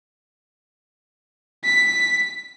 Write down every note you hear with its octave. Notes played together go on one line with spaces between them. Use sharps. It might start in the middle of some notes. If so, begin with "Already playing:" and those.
B6